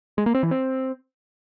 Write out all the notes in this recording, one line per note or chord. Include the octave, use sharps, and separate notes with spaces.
G#3
A#3
C4
E3
C4